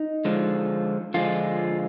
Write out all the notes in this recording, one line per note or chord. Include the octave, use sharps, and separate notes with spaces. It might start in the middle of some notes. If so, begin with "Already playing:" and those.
Already playing: D#4
D3 F3 G#3
D3 F3 G#3 F4